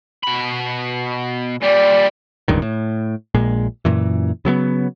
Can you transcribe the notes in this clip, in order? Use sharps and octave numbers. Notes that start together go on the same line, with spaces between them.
B2 B5
A#2 G3 D5
D1 C#2 G2 D#3
A2
A#1 A#2 G#3
F#2 A#2 E3
C#3 F#3 A3 B3